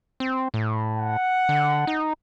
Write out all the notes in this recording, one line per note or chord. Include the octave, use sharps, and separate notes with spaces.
C4
A2
F#5
D3
D#4